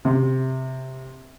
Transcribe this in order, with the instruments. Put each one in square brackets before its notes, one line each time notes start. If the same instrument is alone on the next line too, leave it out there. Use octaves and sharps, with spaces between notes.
[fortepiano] C3